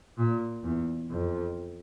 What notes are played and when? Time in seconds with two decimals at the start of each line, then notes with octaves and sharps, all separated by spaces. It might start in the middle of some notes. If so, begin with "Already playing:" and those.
0.18 A#2
0.64 E2
1.10 F2